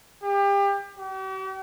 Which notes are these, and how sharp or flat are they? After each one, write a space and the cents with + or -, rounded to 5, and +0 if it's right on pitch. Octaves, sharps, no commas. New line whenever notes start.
G4 +30
G4 -45